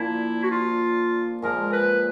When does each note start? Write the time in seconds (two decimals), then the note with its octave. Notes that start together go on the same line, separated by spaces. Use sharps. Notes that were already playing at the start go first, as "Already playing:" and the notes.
Already playing: A#2 F3 A#3 D4 E4
0.43 F#4
0.51 F4
1.42 A#2 F3 G#3 A#4
1.73 B4